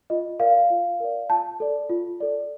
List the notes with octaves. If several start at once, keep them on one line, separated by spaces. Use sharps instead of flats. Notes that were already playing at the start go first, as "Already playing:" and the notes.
F4 D#5
A#4 D5 F5
F4
A#4 D5
F4 A5
A4 D5
F4
A4 D5